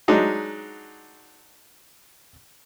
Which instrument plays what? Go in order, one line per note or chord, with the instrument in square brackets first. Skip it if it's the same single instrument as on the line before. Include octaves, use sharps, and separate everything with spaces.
[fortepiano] F#3 G#3 D4 D#4 F#4